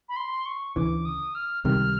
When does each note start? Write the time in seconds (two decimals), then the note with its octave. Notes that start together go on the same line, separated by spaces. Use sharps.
0.09 B5
0.16 C6
0.46 C#6
0.76 D2 C#3 E3 D6
1.05 D#6
1.35 F6
1.64 C#2 C3 D#3 G3 F6